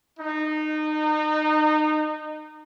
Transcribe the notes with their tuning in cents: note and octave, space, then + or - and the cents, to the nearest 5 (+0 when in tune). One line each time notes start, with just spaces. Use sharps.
D#4 -25